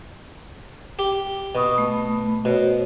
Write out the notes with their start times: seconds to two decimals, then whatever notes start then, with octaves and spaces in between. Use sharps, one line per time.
0.99 G4
1.55 B2 B5 C#6 D#6
1.76 A3 B5
2.45 B2 F#4 C5 C#5